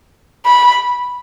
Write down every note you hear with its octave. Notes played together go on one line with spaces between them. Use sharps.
B5